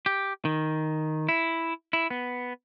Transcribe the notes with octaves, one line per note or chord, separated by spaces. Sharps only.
G4
D#3
E4
E4
B3